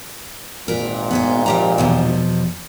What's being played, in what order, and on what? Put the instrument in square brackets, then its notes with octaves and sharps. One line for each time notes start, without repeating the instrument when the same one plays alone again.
[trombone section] G#1 A#2 [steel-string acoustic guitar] A#4 B4
[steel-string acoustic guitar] B3 G#4 C5
F3 G4 A#5
E2 B2 F3